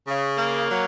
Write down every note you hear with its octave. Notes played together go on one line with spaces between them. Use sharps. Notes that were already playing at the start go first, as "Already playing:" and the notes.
C#3
A#3
F#3